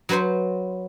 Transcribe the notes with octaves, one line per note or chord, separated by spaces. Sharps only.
F#3 F#4 B4 C5 C6